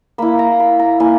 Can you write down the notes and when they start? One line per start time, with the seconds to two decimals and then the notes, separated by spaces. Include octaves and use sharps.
0.18 A#3 E4 B5
0.39 A#5
0.60 B5
0.79 A#5
1.00 A#3 E4 G#5